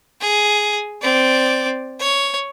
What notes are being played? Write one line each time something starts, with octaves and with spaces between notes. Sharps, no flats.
G#4
C4 D5
C#5